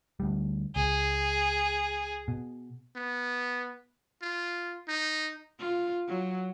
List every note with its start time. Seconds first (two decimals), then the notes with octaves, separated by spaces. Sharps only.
0.20 D2 G3
0.76 C#2 G#4
2.28 B2
2.96 B3
4.22 F4
4.88 D#4
5.59 F4
6.08 F#3